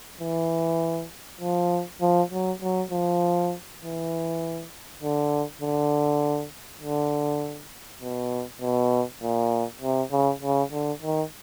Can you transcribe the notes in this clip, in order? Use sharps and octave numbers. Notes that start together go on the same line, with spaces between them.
E3
F3
F3
F#3
F#3
F3
E3
D3
D3
D3
B2
B2
A#2
C3
C#3
C#3
D3
D#3